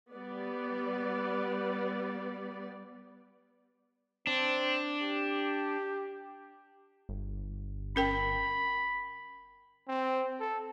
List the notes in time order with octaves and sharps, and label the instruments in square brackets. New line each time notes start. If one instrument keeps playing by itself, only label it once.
[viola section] G3 B3 D5
[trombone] C4 [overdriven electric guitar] D4
[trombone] G4
[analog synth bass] G1
[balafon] C#4 A#4 G5 [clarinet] B5
[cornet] C4
A4